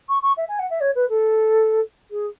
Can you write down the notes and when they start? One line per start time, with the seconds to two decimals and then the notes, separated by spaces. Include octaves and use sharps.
0.09 C#6
0.22 C#6
0.37 E5
0.48 G#5
0.59 F#5
0.70 E5
0.80 C#5
0.95 B4
1.09 A4
2.11 G#4